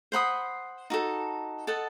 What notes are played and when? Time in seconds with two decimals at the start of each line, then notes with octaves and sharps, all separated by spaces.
0.12 C5 F#5 B5 D#6
0.90 D#4 F#4 A4
1.67 A4 D#5 F#5 A5